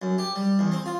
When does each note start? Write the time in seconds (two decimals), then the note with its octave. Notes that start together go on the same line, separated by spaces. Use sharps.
0.02 F#2
0.18 G4
0.36 G3
0.59 E2
0.72 C4
0.86 F4